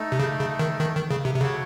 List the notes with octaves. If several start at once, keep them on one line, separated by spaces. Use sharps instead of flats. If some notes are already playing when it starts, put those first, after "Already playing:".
Already playing: A3 D#4 A4
C3
C#3
C#3
D#3
D#3
D#3
C#3
C3
C3
C#3 F#4 A4 C#5 F#5